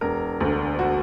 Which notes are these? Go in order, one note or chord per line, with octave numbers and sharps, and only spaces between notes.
E1 A#4
D2 D3
F#4